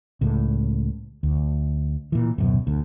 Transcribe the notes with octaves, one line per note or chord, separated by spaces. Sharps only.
C#2 A2
D2
A#2 E3
D1 F#2 B2
D2